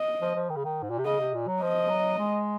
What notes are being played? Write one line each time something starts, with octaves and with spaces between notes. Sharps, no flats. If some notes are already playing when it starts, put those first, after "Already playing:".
Already playing: D#5
F3
F3
D#3
C#3
D#3
G#2
A#2
C3
C#3 D#5
C3
A#2
F#3
F3 D#5
F#3
G#3